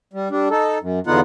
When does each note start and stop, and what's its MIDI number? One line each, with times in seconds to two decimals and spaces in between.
0.13 0.28 55
0.31 0.48 55
0.31 0.48 62
0.51 0.78 63
0.51 0.78 69
0.82 0.99 42
1.07 1.21 40
1.07 1.21 50
1.07 1.21 59
1.07 1.21 63
1.07 1.21 65
1.07 1.21 78